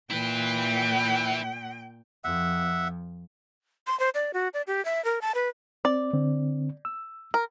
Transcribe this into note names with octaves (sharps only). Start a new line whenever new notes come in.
A#2 E4 B4 G5
F2 E5 F#5
C6
C5
D5
F#4
D5
G4
E5
A#4
A5
B4
C4 D5
D3 C4
E6
A#4